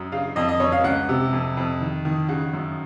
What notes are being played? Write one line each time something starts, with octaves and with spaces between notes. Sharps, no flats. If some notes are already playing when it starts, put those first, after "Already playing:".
Already playing: F#2 D#6
C#3 F5
F2 D#5
D#5
F2 C#5
F5
C#2 F#5
C3
F2
F2
D#3
D#3
C#3 F#5
F#2